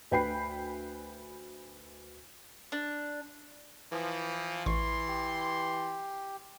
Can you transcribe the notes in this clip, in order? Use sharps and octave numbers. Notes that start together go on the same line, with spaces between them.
D2 B4 G5 B5 C7
D4
E3 F3
A1 E3 C6 C#6
G4